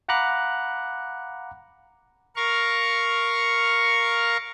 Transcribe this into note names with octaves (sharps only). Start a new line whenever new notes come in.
F5 F#5 A#5 B5 D6 F#6
A#4 F5 C#6